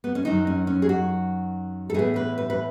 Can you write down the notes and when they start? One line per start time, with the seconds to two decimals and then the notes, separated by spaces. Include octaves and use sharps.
0.04 B3
0.15 C#4
0.25 F#2 D#3 F#3 D#4
0.47 C#4
0.67 C#4
0.82 G#4
0.89 F#4
1.90 A4
1.94 A2 E3 B3 G#4
2.16 B4
2.38 B4
2.50 B4